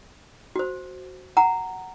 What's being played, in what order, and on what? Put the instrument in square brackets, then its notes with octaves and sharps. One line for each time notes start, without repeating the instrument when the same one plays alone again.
[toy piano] F#4 C5
F#5 A#5